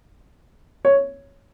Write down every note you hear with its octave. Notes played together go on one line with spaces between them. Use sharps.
C#5